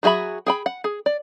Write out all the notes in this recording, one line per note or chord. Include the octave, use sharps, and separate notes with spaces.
F#3 F#4 G#4 E5 B5
G#4 G5 B5
F#5
G#4
D5